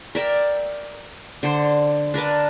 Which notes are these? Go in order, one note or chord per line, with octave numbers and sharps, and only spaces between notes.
A#4 D5 E5 G5
D3 C5
D4 A#4 B4 A5